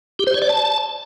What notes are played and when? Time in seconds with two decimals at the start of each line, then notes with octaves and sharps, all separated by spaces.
0.19 G4
0.27 C5
0.34 C#5
0.42 D5
0.49 A5